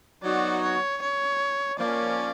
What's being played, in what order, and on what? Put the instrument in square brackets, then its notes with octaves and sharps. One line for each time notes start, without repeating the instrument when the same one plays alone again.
[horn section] F#3 B3 D#4 F#4 [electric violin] D5
[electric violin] C#5
C#5
[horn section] F3 A#3 C#4 [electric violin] D5